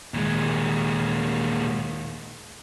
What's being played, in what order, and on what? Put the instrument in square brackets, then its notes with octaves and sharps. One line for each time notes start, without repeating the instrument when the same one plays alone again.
[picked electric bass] D#2 D#3 [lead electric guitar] A#2 G#3